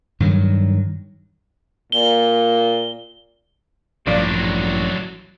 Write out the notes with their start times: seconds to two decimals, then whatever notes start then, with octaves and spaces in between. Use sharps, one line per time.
0.20 G2 D#3 F#3
1.92 A#2 G7
4.07 A1 G2 A#2 F3 F#3 D4 D5